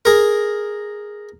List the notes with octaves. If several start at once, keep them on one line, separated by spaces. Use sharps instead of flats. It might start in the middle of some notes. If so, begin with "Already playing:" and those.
G#4 A#4